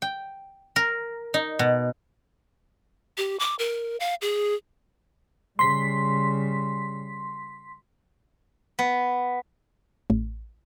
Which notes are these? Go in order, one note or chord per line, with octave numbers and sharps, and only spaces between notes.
G5
A#4
D#4
B2
G4
D6
A#4
F5
G#4
C#3 G3 C6 B6
B3
A1